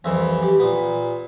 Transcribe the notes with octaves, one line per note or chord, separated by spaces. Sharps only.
C2 F2 E3 E5
G4
A#2 B3